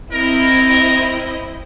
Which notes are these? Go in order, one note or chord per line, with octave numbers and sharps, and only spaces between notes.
C4 E4 A#4 D#5